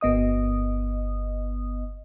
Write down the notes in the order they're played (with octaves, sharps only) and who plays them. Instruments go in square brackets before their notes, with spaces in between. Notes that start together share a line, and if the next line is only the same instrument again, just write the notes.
[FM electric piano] G1 B3 D#5 D#6